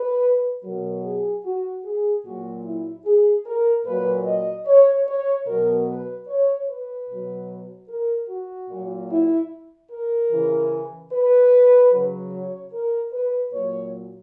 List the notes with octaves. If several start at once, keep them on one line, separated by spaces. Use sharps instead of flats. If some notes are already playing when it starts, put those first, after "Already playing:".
Already playing: B4
B2 F#3 A#4
G#4
F#4
G#4
A#2 F#3 F#4
E4
G#4
A#4
A#2 F#3 B4
D#5
C#5
C#5
B2 F#3 A#4
B4
C#5
B4
B2 F#3
A#4
F#4
A#2 F#3
E4
A#4
C#3 E3
B4
C#3 F#3
C#5
A#4
B4
A#2 F#3 C#5